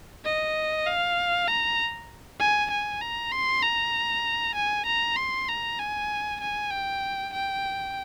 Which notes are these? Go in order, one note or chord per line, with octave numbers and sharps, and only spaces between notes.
D#5
F5
A#5
G#5
G#5
A#5
C6
A#5
G#5
A#5
C6
A#5
G#5
G#5
G5
G5